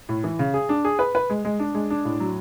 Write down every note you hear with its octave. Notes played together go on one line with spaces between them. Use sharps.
A2
E3
C#3
G#4
D4
G#4
B4
B4
G#3
G#3
D4
G#3
D4
A2
F#3